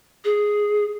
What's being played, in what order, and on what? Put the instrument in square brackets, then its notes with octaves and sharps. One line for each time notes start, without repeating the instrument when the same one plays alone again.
[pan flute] G#4